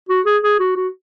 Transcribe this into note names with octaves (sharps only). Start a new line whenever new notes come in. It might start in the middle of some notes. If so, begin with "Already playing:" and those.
F#4
G#4
G#4
F#4
F#4